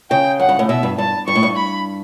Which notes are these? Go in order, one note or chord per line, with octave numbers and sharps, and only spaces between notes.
C#3 G5
F#2 F#5
G2
A2
B2 E5
G2
G2 A5
G2 C#6
A2
G2
B5